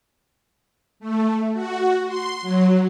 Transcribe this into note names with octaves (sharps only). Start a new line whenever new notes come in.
A3
F#4
C6
F#3